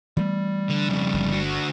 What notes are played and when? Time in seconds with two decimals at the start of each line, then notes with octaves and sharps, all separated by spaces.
0.17 E3 G3 A3 B3
0.69 D3
0.89 F2 C#3
1.14 G1
1.31 D3 F#4